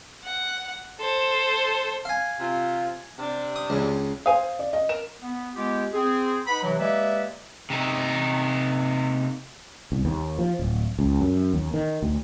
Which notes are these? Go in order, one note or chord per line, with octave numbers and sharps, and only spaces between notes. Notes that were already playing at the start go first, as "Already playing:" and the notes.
F#5
A4 C5
F5 G#5
C3 F4
C3 D4
D#6
C#2 C#3
C5 F5 G#5 D#6
D5
D#5
A#4 E7
B3
G#3 B3 F4 G4
C4 G#4
D#4 B4 F#5 B5
C3 E3 F#3
G#3 A#3 G4 B4 D5 E5
C3 D#4
C2
D#2
F3
D1
C#2
F#2
D#2
D#3
D2